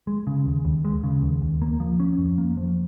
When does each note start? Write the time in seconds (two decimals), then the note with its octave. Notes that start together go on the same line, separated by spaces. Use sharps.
0.07 G#3
0.27 C#3
0.46 D#2
0.65 D#2
0.85 G#3
1.04 C#3
1.22 D#2
1.42 D#2
1.62 A#3
1.80 F3
2.00 C#4
2.18 F2
2.38 A#3
2.57 F3